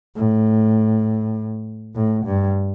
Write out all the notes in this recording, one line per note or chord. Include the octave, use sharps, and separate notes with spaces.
A2
A2
G2